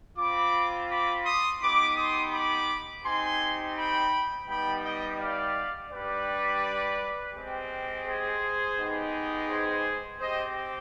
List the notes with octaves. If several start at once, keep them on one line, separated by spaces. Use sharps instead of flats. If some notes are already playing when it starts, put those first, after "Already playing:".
C4 F4 B5 D6
B5 D6
C6 D#6
B3 D#4 G4 B5 D6
C6 D#6
B5 D6
C4 D#4 G4 G#5 C6
G5 B5
G3 B3 D#4 G4 G5 B5
D#5 G5
D5 F5
G3 D4 G4 B4 D5
G#3 C4 G4
G#4 C5
G#3 B3 D#4 G4
G#4 C5
C4 G4 C5 D#5